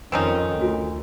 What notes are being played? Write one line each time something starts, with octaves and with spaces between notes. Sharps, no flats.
F2 D#3 C4 C#4 D#4
D2 F4 F#4 G#5